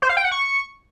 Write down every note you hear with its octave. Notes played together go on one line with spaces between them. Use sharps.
C5
F5
G5
F#5
C#6